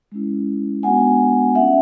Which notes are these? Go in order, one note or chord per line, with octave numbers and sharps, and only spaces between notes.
G#3 C#4 E4
G#3 B3 D4 F#4 F#5 G#5
A3 C#4 F4 E5 F#5